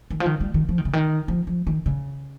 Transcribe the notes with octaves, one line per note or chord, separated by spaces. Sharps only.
D#3
F3
D#3
G3
D#3
F3
D#3
C#3
D#3
F3
F3
D#3
C#3